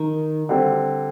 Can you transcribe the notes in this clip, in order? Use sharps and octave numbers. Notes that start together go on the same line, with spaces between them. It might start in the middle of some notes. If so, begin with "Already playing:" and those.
Already playing: D#3
D3 G3 C4